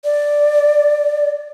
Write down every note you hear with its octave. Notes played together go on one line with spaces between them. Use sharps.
D5